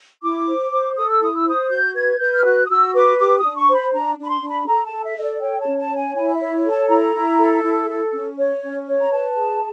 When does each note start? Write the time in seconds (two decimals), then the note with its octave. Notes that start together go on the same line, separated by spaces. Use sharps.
0.23 E4 D6
0.47 C5
0.72 C5
0.96 A4 D#6
1.10 E6
1.21 E4 D#6
1.35 E6
1.46 C5 D#6
1.70 F#4 G6
1.95 B4 G#6
2.19 B4 G6
2.34 F6
2.44 F#4 F#6
2.65 D#6
2.70 F#4 E6
2.94 B4 D6
3.18 G4 D6
3.38 D4 D#6
3.55 C#6
3.69 C5
3.74 B5
3.92 D4 A#5
4.18 D4
4.23 B5
4.29 C6
4.42 D4
4.49 B5
4.67 A4 A#5
4.85 A5
4.92 A4
5.05 E5
5.17 A4 D#5
5.23 D5
5.41 C#5 G5
5.59 A5
5.66 C#4
5.78 A5
5.90 C#5
5.96 G#5
6.15 E4 G#5
6.34 E5
6.41 C#5
6.64 A4
6.70 A5
6.89 E4 A#5
7.15 E4
7.39 A4
7.63 E4
7.89 A4
8.13 C#4
8.38 C#5
8.63 C#4
8.87 C#5
9.01 A#5
9.11 B4 A5
9.36 G#4